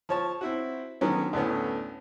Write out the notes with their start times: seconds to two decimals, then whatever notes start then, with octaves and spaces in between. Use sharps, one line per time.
0.09 F3 C#5 A5
0.41 C4 E4 F#4
1.01 D3 D#3 F#3 B3 C#4
1.33 D2 A2 B3 C#4